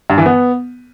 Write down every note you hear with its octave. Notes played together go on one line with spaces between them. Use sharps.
G2
E3
B3